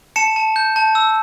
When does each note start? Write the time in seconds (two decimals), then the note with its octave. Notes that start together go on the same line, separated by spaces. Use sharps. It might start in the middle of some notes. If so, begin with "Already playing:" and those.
0.16 A5 C#7 E7
0.36 A5
0.56 G6
0.76 A5
0.95 E6